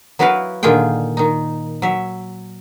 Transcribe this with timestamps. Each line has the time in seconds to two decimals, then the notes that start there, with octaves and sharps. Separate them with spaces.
0.19 F#3 B3 E4 F#4 B4 F5
0.63 A#2 D3 D#3 F4 G#4 G5
1.17 D#3 D#4
1.82 F#3 E5